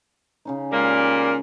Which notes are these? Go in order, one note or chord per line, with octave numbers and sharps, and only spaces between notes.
C#3 C#4 D#4
A#2 G3 G#3 A#3